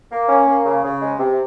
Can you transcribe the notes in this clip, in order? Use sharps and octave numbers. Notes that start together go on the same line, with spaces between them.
A#3
C#4
A#3
C#3
C#3
G#3
C3